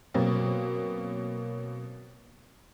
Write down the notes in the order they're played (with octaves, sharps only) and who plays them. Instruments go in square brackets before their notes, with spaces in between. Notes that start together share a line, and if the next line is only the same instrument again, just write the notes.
[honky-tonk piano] B2 F#3 A#3 C4